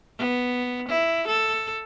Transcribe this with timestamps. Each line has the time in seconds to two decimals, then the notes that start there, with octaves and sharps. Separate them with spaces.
0.18 B3
0.88 E4
1.28 A4